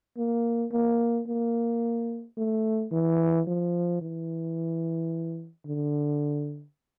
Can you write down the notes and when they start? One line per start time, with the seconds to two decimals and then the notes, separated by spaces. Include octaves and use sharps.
0.18 A#3
0.72 A#3
1.27 A#3
2.37 A3
2.92 E3
3.47 F3
4.02 E3
5.66 D3